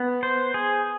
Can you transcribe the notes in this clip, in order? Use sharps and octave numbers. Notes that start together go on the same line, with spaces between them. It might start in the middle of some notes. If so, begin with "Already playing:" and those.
Already playing: B3
C5
G#4